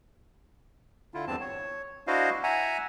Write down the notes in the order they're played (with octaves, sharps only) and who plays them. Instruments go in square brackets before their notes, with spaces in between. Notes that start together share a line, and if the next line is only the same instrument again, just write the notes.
[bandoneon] D3 E4 F4
E2 G2 C4 A5
C#5
D4 E4 F#4 C5 D#5 F5
E5 F#5 G#5 A#5